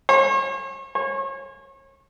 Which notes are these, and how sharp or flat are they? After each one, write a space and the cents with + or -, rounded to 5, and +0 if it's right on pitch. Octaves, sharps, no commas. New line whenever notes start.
C#5 -45
C#5 -35